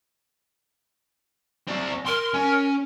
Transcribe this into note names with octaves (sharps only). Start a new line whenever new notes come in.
C4 D5
A#4 C6
C#4